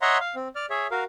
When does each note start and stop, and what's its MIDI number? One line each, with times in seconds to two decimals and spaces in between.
0.02 0.18 73
0.02 0.18 75
0.02 0.18 76
0.02 0.18 78
0.02 0.18 82
0.02 0.18 84
0.20 0.35 77
0.35 0.48 60
0.55 0.66 74
0.55 0.66 89
0.70 0.87 68
0.70 0.87 73
0.70 0.87 76
0.91 1.04 66
0.91 1.04 70
0.91 1.04 77